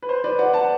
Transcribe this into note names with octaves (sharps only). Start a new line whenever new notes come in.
B4
C5
B4 D5
D5 F#5
F#5 A5